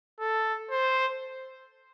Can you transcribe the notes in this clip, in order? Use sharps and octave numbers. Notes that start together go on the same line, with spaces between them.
A4
C5